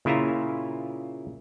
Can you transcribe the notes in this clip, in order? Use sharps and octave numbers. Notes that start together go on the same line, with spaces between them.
A#2 C#3 E4 F4 E5 A#5